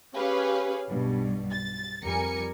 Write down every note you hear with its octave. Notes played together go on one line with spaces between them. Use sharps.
C#4 G4 G#4 B4 C#5 F5
B1 G2 B2
A6
F2 G3 A#4 G#5 C#7